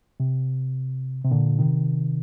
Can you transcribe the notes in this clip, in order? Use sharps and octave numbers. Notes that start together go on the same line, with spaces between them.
C3
C3
A#2 D3
C3 D#3